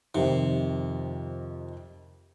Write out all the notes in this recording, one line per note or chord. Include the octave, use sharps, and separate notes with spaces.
F2 C3 D#3